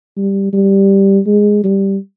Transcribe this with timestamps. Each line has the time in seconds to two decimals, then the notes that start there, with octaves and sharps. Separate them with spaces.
0.17 G3
0.53 G3
1.27 G#3
1.64 G3